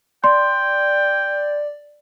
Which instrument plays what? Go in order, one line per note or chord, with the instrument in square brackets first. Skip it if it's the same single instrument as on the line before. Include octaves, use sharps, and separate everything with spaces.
[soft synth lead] D5 [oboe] G5 [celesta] C6